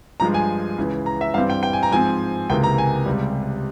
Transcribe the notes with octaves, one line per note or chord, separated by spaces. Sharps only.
G2 F3 G#3 A#5
G#5
C#2 C#3 E3
A#5
E5
G2 E3 G3 C4 F5
G5
G5
G#5
A#5
G#2 F3 C4 G#5
C#2 C3 E3 A#3 G5
A#5
G#5
C#2 C3 G3